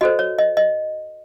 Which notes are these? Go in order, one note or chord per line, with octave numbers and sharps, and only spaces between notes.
F#4 A4 C5 D#5
C#5
D#5
D#5